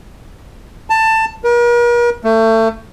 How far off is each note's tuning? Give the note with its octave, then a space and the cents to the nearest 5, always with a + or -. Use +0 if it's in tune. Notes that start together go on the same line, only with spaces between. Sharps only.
A5 +15
A#4 +45
A3 +30